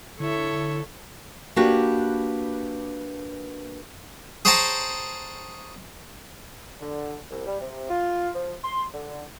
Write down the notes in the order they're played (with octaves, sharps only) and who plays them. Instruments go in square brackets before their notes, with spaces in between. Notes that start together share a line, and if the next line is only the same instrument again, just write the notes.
[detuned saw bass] D3 [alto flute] E4 [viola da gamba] A4 [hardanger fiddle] C#5 E5
[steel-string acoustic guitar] A#3 D4 F#4 G4 B4
[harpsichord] G#4 C5 C#5 G5 A5 A#5
[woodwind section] D3
C2
G3
C3
F4
F3
C6
D3